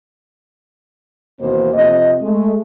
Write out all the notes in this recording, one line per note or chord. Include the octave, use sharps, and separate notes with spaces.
D#2 B2 E3 A#3 C4 C5
F2 C3 C4 D#5
G#3 A3